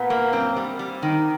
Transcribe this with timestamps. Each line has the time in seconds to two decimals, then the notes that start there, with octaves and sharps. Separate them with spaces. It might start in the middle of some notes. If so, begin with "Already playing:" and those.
Already playing: A#2 B3
0.10 A#3
0.32 F#2 C4
0.57 G3
0.79 G3
1.03 D#3